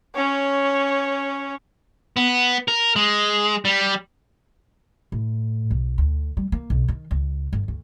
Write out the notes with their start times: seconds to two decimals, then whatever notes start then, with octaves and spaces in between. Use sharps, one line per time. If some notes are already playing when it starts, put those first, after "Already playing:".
0.15 C#4 C#5
2.17 B3
2.68 A#4
2.96 G#3
3.65 G3
5.12 A2
5.71 B1
5.98 D2
6.37 G3
6.52 A#3
6.70 B1
6.88 D#3
7.11 C#2
7.53 G1
7.68 D2